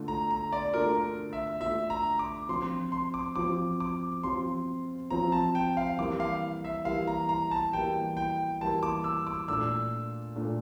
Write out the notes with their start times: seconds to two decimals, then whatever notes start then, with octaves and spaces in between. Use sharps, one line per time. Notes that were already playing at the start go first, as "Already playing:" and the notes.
Already playing: D3 A3 D4 F4
0.08 A#5
0.31 A#5
0.53 D5
0.74 D3 A3 D4 F4 A#4
1.33 E5
1.61 D3 A3 D4 F4 E5
1.90 A#5
2.19 D6
2.49 F3 C4 F4 C6
2.92 C6
3.14 D6
3.36 F3 C4 F4 D6
3.80 D6
4.23 F3 C4 F4 C6
5.10 F3 C4 F4 A#5
5.32 A5
5.55 G5
5.77 F5
5.98 E3 G3 A#3 E4 D6
6.20 F5
6.64 E5
6.85 E3 G3 A#3 E4 F5
7.07 A#5
7.29 A#5
7.51 A5
7.73 E3 G3 A#3 E4 G5
8.17 G5
8.61 E3 G3 A#3 E4 A5
8.83 D6
9.04 E6
9.27 D6
9.48 A#2 A3 D4 E6
10.36 A#2 A3 D4